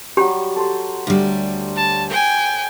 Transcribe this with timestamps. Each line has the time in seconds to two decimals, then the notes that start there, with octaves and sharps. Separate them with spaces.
0.17 F#3 G3 G4
0.56 A4 C5
1.07 D2 G3
1.76 A5
2.10 G5 G#5